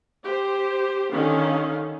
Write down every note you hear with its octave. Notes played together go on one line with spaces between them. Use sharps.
G4 C5
D3 D#3 C#4 F5